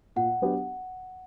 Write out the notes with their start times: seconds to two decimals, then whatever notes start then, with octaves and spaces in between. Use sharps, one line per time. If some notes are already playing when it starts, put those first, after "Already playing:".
0.16 A#2 F#5
0.42 F#3 B3 D4 G4